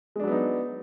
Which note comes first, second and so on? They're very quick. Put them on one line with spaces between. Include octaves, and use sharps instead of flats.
G#3 D4 F#3 B3 D#4